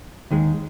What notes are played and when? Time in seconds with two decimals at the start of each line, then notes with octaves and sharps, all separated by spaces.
0.31 D#2 D#3 G#3